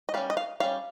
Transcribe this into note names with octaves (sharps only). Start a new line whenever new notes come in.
D#5
G3 C#4 F5
D#5
F5
G3 C#4 F5